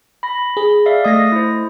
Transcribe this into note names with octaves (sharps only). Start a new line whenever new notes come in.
B5 A#6
G#4
D5 E5 F5
A3 D#5 D#6 A#6
E4 C5